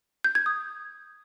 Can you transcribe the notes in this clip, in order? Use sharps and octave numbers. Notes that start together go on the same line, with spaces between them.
G6
G#6
D#6